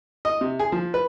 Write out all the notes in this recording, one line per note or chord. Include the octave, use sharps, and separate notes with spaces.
D#5
C3
G#4
F3
B4